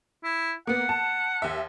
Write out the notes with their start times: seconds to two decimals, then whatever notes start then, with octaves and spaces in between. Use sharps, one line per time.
0.24 E4
0.67 A#3 B3 F#5
0.89 A5
1.42 D#2 E5